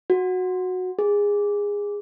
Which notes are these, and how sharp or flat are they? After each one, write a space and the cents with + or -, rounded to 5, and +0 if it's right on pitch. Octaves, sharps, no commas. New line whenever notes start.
F#4 -10
G#4 -20